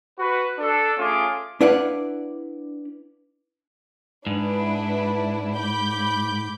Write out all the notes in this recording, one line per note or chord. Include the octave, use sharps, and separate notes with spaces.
F#4 B4
D4 A4
A3 C#4 F4 G#4 D6
D4 E4 B4 D5 F5 F#5
G#2 D4 E4 B4
B5 D6 G6